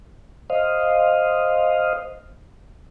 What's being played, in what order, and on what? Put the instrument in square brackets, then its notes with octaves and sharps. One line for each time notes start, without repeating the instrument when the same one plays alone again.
[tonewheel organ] C5 D#5 F5